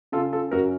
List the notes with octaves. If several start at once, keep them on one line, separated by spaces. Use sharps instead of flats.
C#3 F4 A4
F4 A4
F#2 F#4 A#4